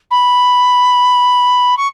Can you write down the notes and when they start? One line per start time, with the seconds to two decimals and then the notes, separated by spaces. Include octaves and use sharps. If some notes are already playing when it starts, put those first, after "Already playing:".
0.11 B5
1.77 C#6